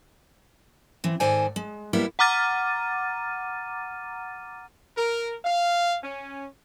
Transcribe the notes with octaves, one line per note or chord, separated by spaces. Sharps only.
E3 C4
G#2 D#3 A4 C5 D5 G#5
G#3
G3 G#3 A#3 B3 E4 G4
F#5 A#5 D6 F6 A6 D#7
A#4
F5
C#4